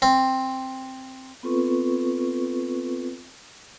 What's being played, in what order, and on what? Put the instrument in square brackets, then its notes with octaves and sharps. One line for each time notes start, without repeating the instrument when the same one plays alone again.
[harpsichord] C4
[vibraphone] B3 C4 F4 A4 B4 C#6